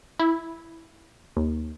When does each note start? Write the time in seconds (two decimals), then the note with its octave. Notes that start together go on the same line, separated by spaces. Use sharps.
0.19 E4
1.37 D#2